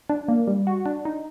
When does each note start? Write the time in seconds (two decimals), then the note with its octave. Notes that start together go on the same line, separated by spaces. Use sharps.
0.09 D4
0.28 A#3
0.48 G3
0.67 F#4
0.86 D4
1.05 D#4